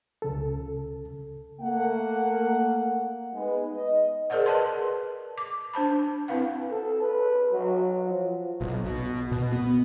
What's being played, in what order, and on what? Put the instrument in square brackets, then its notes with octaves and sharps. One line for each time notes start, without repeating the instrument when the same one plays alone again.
[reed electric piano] C#2 C#3 A4
[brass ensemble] A3 A#3 F#5
G#3 B3 D#4 B4
D#5
[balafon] G#4 A#4 C5 D5 D#5 F#5
B4 D#5 A5 C6
D6
D4 C5 A5 B5
C4 E4 B4 F5 F#5
[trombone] A4
B4
F#3
F3
[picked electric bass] B1
B2
B2
B3